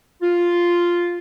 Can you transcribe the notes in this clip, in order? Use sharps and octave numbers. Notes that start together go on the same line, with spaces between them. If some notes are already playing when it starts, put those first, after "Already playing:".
F4